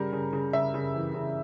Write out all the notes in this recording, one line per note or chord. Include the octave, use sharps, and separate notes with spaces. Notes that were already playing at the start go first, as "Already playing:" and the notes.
Already playing: C#3 G3 A#4
C#3
C#3
C#3 E5
C#3
E3
C#3